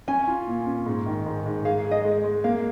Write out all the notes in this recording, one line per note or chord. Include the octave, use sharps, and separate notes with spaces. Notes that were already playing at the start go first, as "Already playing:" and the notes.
C#4 G#5
F4
A#2
C#4
G#2
D#3
G#2
G#2
G#4 F5
G#4
D#5
G#3
G#3
A#3 F5